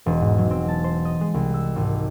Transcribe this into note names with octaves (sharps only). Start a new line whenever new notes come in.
E1
G#2
F#3
C4
A5
C5
D#5
G#3
C2
E6
G#1